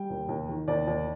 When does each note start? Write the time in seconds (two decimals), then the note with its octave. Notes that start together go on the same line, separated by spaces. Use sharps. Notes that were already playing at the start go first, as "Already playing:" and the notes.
Already playing: G3 G5
0.10 D#2
0.29 D#2
0.49 D#3
0.68 D#2 D5
0.87 D#2